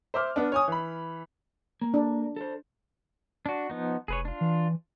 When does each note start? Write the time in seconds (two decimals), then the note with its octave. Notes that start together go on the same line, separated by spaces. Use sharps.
0.14 C5 E5 D6 F6
0.36 B3 D4
0.52 C#5 G#5 D#6
0.68 E3 B5
1.82 A#3
1.94 D4
2.36 A4 C5
3.46 D4 F#4
3.70 F3 B3 D#4
4.08 F1 G#4 B4 C#5
4.25 D4 F4
4.41 E3